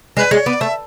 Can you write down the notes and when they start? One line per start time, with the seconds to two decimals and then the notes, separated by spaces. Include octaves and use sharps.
0.17 G#3 B4
0.31 G#3 C#5
0.46 B3 D5
0.60 A3 E5